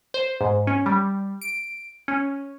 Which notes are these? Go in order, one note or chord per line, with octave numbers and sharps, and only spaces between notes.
C5
G#2
C#4
G3
D7
C#4